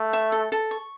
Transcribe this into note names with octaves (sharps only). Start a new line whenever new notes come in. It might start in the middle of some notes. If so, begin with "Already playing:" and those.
Already playing: A3
E5
A4
A4
C#6